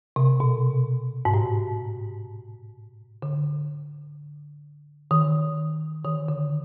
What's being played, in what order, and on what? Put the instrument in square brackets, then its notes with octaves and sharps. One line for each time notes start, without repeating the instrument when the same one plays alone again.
[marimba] C3
B2
G#2
A2
D3
D#3
D#3
D3